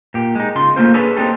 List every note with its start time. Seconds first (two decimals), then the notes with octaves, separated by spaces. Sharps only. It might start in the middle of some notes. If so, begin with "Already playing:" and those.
0.14 A#2 G4
0.35 G#3 D#4
0.56 C#3 D#4 F4 C6
0.76 A3 A#3 C#4 D4 F4 C5
0.94 D4 G#4 A4 B4 C#5
1.16 A#3 C4 D4 D#4 G4 A4